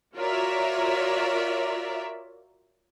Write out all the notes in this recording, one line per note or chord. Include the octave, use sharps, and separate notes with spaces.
F4 F#4 A#4 C#5 D5 E5